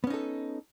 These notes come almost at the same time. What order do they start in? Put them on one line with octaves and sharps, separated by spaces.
B3 C#4 D#4 A4